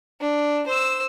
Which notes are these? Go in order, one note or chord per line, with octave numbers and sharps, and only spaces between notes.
D4
C5 E6